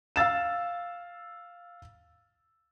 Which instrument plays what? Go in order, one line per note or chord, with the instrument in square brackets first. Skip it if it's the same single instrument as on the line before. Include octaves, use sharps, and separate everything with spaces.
[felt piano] F5 E6 A6 E7